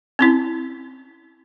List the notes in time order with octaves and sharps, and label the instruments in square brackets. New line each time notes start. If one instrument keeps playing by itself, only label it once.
[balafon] C4 C#4 E4